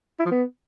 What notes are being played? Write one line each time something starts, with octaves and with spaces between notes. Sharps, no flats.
E4
F3
B3